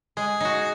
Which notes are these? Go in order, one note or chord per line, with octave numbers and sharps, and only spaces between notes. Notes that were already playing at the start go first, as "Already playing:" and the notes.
G#3 G#4
D#4 F#4